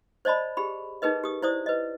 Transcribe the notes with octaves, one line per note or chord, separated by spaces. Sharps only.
C5 D5 D#5 A5 B5
G4 G#4 B5
D#4 G#4 A#4 B4 D#5
G4 D#6
E4 C5 D5 D#6
B4 D#5